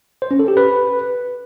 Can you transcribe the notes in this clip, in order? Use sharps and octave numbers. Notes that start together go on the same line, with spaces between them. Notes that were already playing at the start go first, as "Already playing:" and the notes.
C5
C#4
A4
G4
B4